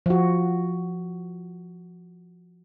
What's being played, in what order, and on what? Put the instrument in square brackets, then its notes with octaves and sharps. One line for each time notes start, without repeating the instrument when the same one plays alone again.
[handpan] F3 F#4